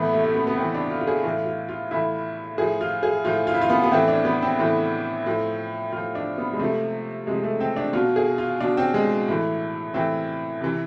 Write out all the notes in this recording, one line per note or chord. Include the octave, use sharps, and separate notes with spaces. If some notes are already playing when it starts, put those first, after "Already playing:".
Already playing: A2 E3 B3
A3
A3
B3
B3
A2 E3 C4
D4
F4
F4
G#4
A2 E3 F4
F4
F4
A2 E3 E4
A2 F3 G#4
F4
G#4
A2 F3 F4
F4
E4
F4
B3
B3
A2 E3 C4
D4
B3
C4
A2 E3
A2 F3
A2 F3 F4
D4
B3
G#3
C3 F3 A3
C3 F3 G#3
A3
C4
D4
B2 F4
G#4
F4
B2 D4
C4
G#3
A2 E3
A2 E3 C4
C3 E3